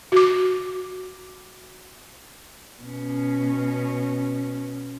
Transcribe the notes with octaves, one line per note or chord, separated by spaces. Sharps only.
F#4 D6
B2 C#4